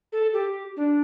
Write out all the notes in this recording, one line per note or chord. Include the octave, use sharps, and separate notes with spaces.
A4
G4
D4